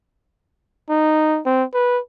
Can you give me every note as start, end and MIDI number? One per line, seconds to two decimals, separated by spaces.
0.89 1.40 63
1.46 1.64 60
1.74 2.00 71